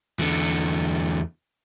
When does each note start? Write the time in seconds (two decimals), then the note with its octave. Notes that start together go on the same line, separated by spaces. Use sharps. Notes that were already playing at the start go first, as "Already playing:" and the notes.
0.19 E2 D3